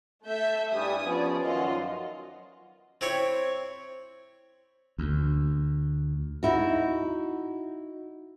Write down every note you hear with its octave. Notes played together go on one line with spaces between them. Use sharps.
A3 E5 G6
G2 G3 E4 G#5 D#6
F3 B3 C#4 C#5 D5
F#2 D#3 F3 F4 F#4 D#5
C4 E4 C#5
D2
D#4 E4 F#4